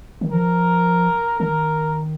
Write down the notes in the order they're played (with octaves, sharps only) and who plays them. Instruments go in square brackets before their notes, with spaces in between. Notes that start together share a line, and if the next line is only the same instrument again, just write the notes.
[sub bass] D#3
[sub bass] F3 [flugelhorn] A#4
[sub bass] D#3 [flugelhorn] A#4